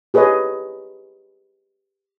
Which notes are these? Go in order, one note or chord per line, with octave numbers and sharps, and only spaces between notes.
G4 G#4 B4 C#5 D#5